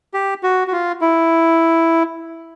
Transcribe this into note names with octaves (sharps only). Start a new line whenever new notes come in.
G4
F#4
F#4
F4
E4